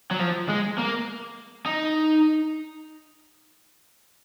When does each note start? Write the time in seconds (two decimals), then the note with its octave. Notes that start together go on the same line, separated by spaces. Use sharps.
0.11 F#3
0.19 F3
0.49 G#3
0.78 A#3
1.66 D#4